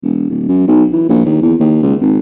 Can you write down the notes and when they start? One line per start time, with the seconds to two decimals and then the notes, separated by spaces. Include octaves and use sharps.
0.03 E1
0.29 D1
0.48 F#2
0.67 B1
0.92 E3
1.09 A#1
1.25 D#2
1.42 E2
1.60 D#2
1.83 C#2
2.01 G#1